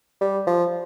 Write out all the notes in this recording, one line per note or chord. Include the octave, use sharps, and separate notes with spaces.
G3
F3